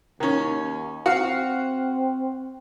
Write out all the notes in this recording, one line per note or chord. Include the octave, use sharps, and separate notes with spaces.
D#2 D#3 C#4
C4 F#4 F5